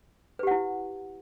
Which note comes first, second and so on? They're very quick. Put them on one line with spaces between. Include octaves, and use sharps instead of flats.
B4 G4 F#5 E4